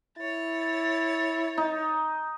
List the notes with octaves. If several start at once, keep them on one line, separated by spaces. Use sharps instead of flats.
E4 C#5 A6
D#4